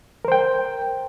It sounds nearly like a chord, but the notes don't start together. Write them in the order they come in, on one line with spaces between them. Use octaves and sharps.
A#4 C5 G5